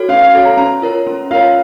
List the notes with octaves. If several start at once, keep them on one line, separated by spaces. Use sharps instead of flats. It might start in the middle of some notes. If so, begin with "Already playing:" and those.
Already playing: F#4 A4 C#5
C#4 F5
F5
F#4 A4 C#5
A#5
C#4 A#5
F4 A#4 C#5
C#4
F4 A#4 C#5 F5